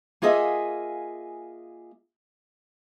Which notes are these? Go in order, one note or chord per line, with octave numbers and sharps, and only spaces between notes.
A#3 F4 G#4 D#5 E5 G#5